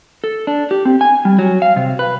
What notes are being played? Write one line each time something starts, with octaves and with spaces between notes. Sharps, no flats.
A4
D4
G4
C4
G#5
G3
F#3
F5
C3
B4